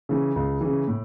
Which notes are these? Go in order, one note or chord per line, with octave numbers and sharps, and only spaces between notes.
C#3 E3
C#2
C#3 E3
A2